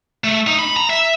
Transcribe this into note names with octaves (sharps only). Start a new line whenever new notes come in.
A3
D#4
B5
A#5
E5